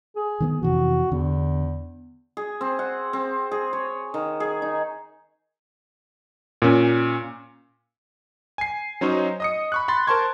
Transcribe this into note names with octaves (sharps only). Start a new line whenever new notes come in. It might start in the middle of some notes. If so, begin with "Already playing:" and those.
G#4
D#3 A#3 B3
F2 C3 E3 F#4
E2 D3
G#4
C4
F#5
C4
G#4
C#5
D#3
G#4
D#4
A#2 C#4
G#5 C7
F#3 C#4 D#4 C5 C#5 D#5
D#5 D#6 C#7
B5 C#6 F#6
B5 C6 A6
A#4 C5 A5 C6 C#6 G#6